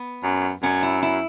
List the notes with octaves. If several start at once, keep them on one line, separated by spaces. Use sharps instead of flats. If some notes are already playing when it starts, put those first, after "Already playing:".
Already playing: B3
F#2
F#2 C#4
E4
E4